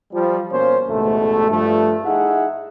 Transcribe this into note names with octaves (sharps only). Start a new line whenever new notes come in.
F3 G3
B2 A#3 C#4 C5
A1 D2 G#2 B2 A3
G2 F3 A3
D#4 E4 G#4 E5 F#5